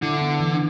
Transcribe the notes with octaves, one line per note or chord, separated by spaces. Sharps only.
D3 E4
B3
E3